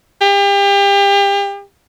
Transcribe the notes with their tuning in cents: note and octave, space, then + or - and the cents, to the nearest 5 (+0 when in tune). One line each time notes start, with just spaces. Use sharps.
G4 +35